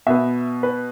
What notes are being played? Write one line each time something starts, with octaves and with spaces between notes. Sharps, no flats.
B2 B3 E5
B4